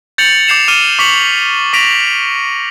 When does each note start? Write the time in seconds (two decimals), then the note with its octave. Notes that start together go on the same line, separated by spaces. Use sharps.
0.18 G6 A6 C#7 F7 F#7
0.47 D6 G6 C7 E7 F7
0.68 D6 F6 D#7 E7 G7
0.99 C#6 D6 B6 C#7 F7 F#7
1.73 D6 A#6 B6 D7 F7